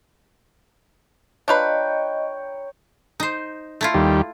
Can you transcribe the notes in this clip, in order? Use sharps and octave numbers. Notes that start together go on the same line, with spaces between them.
D4 F4 B4 C#5 D#5 G5 A#5
D#4 C5
A3 E4 F4
D#2 G3